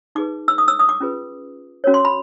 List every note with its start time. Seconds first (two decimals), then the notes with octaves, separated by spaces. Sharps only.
0.15 D#4 G#4 B4 D6
0.48 E6
0.58 D#6
0.68 E6
0.79 D#6
0.89 D6
1.01 C#4 F4 G#4 B4
1.84 C#4 F#4 A#4 C#5
1.94 C6
2.05 B5